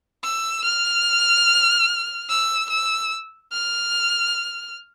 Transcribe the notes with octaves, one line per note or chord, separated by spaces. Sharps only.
E6
F6
E6
E6
F6